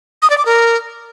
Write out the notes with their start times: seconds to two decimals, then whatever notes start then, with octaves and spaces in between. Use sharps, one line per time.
0.22 D#6
0.30 D5
0.38 D6
0.46 A#4